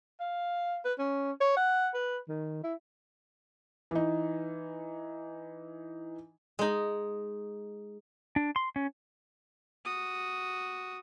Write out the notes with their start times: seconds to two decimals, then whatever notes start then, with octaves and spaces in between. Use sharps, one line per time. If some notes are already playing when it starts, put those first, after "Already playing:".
0.20 F5
0.85 B4
0.98 C#4
1.41 C#5
1.57 F#5
1.94 B4
2.29 D#3
2.64 E4
3.91 E3 D#4
6.59 G#3 D#4
8.36 D4
8.56 C6
8.76 C#4
9.85 F#4 D#6